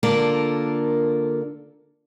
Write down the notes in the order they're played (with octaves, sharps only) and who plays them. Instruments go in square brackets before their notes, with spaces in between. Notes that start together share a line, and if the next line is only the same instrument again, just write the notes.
[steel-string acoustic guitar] D3 A#3 D4 F4 A4 A#4